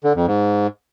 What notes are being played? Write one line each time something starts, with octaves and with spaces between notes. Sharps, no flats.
D3
F2
G#2